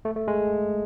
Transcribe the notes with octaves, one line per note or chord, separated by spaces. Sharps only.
A3
A3
G#3